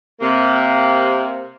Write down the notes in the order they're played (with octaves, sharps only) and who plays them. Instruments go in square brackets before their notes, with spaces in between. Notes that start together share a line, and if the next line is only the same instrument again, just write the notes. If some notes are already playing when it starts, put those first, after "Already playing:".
[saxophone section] C3 A#3